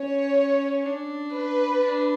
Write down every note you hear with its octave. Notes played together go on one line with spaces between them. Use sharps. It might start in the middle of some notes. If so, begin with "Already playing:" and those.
Already playing: C#4 C#5
D4
B4
D4